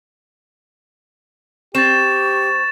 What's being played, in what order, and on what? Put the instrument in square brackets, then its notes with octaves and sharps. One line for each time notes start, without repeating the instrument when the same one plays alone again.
[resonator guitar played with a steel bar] C4 [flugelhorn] G4 [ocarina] C#6 [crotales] A6 E7